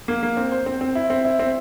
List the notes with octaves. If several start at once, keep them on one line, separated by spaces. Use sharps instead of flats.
A#3
A#3
C4
C5
C4
C4
E4
C4
E4
C4